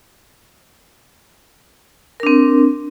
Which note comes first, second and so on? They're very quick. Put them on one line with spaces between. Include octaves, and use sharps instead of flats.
A#4 D4 C4